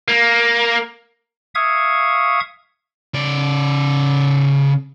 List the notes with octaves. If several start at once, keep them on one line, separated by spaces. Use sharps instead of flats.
A#3
E5 F5 C#6 D#6 G#6
C#3 D5